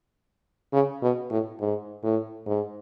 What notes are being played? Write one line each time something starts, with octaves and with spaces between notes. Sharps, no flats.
C#3
B2
A2
G#2
A2
G#2